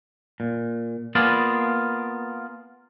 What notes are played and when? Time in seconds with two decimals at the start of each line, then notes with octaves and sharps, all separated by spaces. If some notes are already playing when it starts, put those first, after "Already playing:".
0.40 A#2
1.15 A#3 B3 F4 G#4 D5